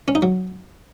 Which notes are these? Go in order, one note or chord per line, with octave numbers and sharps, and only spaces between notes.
C#4
D#4
F#3